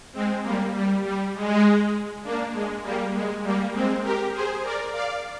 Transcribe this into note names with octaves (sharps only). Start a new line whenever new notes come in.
G#3 C4
G3 A#3
G3
G3
G#3
A#3 D4
G#3
G3 A#3
G#3
G3 A#3
G#3 C4
G4 A#4
G#4 C5
A#4 D5
D5 F5